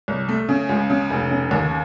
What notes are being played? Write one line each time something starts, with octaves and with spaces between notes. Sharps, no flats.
C2
A3
C#3
C#2
C#3
F1
C#3
D#2